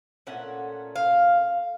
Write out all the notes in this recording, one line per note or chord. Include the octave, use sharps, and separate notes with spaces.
A#2 A3 C#4 F#5
F5